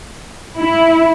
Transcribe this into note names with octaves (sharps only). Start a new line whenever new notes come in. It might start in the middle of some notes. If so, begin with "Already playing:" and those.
E4